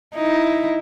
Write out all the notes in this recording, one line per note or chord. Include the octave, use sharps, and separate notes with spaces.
D#4 E4